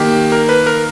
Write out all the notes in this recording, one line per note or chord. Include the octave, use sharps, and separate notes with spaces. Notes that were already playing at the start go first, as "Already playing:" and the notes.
Already playing: D#3 A#3 G4
A#4
B4
A#4